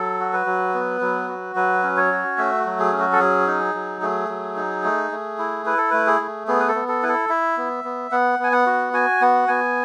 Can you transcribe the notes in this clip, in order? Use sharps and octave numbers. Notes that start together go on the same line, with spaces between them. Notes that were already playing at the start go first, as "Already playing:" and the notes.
Already playing: F#3 A4
F#4
B4
F#3
B3
F#3
F#4
F#3 B4
C#4
C#5
F#4
A3 E5
F#3
G#4
C#4
F#4
A4
F#3 G#4
D#4
F#3
A3 G#4
F#3
D#4
A3
A3
E4
E4 B4
A4
A3 B4
G#4
A3
B3 G#4
B4
A4
B3
A4
E4 B4
A4
E4 E5
B3
B3
B3 F#5
B3 G#5
F#5
F#4
F#4 G#5
B3 F#5
B3 G#5